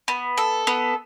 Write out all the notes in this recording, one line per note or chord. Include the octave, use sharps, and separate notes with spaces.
B3
A4
B3